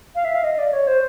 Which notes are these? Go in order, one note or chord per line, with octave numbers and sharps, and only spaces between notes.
F5
E5
F5
D#5
D5
C#5
C5